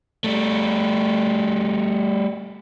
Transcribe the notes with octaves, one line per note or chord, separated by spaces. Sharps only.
G3 A3